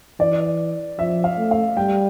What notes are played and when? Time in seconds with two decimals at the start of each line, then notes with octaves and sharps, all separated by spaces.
0.20 E3 D5
0.99 F3 E5
1.24 F5
1.38 A3
1.51 F5
1.77 G3 G5